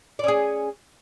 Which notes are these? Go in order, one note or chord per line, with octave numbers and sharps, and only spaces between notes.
C#4 G#4 D5